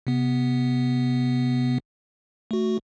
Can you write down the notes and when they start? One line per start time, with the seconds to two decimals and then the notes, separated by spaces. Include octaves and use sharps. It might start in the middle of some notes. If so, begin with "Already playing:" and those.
0.07 C3 B3
2.51 A3 F#4